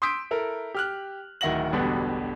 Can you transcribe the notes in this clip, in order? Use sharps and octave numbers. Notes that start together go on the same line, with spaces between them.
C6 D#6 E6 G6 B6 D7
E4 A4 A#4
G4 F6 F#6
D1 D#3 E4 F#5 A#6 F#7
E1 A1 B2 D3 G3 B3